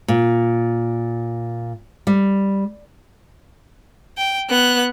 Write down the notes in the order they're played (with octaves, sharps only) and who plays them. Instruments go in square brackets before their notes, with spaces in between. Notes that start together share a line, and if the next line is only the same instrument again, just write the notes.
[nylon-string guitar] A#2
G3
[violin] G5
B3 F#6